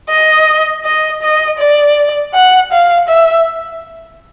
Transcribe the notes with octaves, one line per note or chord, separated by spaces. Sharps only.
D#5
D#5
D#5
D5
F#5
F5
E5